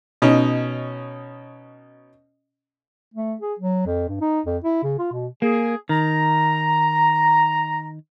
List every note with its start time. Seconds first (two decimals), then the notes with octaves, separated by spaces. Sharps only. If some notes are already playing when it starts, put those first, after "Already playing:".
0.22 B2 C#4 D#4
3.14 A3
3.41 G#4
3.59 F#3
3.86 F2
4.09 G2
4.21 D#4
4.46 F2
4.64 E4
4.83 C#3
4.99 F4
5.12 B2
5.42 A#3 G#4
5.89 D#3 A#5